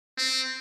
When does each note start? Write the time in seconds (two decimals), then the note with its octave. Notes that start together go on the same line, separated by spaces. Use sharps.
0.17 C4